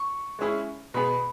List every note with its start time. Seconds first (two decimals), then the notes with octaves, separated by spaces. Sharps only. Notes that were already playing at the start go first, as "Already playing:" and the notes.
Already playing: C#6
0.39 G#3 C#4 E4 G#4
0.94 B2 B3 G#4 B5